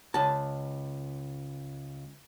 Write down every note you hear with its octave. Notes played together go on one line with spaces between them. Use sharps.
C#2 A5